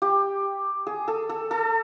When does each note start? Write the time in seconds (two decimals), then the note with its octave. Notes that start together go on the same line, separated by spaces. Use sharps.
0.02 G4
0.87 G#4
1.08 A4
1.29 A4
1.51 A4